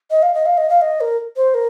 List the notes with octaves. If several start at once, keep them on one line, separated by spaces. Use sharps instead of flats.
D#5
F5
D#5
F5
D#5
F5
D#5
A#4
C5
A#4